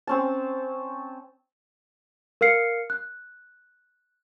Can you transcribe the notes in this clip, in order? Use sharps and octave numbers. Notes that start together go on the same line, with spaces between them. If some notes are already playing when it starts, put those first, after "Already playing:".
C4 C#4 A5
A#4 F5 F6 C7 C#7
F#6